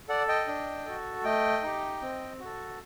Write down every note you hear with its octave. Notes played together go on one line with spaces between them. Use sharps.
A4 D5 F#5
D#5 G5
D4
F#4 A4
A3 D#5 G5
D#4 G4
C4
F#4 A4